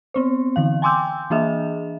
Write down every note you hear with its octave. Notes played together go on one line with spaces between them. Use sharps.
B3 C4 C5
D3 E3 F5
G5 G#5 C6 D6 E6 G6
E3 A#3 D4 G#4 D#5 E5